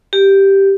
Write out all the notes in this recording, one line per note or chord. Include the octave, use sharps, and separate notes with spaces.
G4